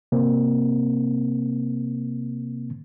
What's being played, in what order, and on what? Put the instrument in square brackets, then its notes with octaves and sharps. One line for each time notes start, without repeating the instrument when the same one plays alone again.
[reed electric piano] C3 A#3 C4